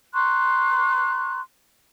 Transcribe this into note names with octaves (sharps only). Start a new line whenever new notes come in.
A#5 C6 C#6 F#6